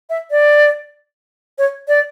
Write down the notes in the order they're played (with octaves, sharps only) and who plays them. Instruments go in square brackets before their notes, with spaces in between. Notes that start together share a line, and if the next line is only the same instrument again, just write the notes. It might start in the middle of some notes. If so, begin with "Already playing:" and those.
[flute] E5
D5
C#5
D5